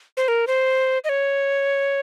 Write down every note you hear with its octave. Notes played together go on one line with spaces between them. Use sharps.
C5
A#4
C5
D#5
C#5